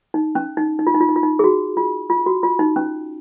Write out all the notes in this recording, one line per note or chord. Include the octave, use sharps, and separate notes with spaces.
D#4
C#4
D#4
D#4
F4
D#4
F4
D#4
F4
D#4
G#4
F#4
F4
F4
F#4
F4
D#4
C#4